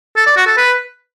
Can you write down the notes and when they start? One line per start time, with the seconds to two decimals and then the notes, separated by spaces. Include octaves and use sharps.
0.17 A4
0.27 D5
0.37 F#4
0.47 A4
0.57 B4